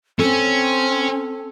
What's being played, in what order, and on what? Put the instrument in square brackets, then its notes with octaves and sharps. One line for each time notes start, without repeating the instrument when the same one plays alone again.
[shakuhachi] C4 [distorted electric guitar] C#4 [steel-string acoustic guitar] A4